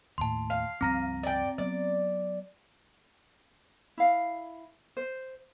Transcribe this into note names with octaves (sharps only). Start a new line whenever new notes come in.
D#2 A2 A5 C6
F5
C#2 G2 F3 C4 A#5 A#6
D5 G5
F#3 B3 D5
E4 F5
C5